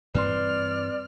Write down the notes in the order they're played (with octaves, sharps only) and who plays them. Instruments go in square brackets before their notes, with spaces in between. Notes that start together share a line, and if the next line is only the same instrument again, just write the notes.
[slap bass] G2 E3 C4 [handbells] B4 C6 [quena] D5 [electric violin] F6